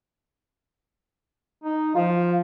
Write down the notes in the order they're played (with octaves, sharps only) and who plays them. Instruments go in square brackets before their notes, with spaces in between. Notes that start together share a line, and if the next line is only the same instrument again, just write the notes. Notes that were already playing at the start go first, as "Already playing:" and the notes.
[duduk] D#4
[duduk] F3 [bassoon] F4